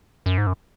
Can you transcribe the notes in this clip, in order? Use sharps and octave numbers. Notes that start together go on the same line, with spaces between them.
F#2
G#2
F#2